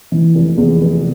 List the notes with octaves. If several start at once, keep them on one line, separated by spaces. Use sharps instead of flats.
E3
F1
E2
F1